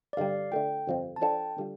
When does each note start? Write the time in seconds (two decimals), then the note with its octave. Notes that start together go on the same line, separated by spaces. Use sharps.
0.13 D5
0.17 G1 G2 D3 G3 F5
0.52 D3 A3 F4 G5
0.87 G1 F2 F3 C4
1.16 A5
1.21 F3 D4 A4 F5 G5
1.58 D3 G3 F4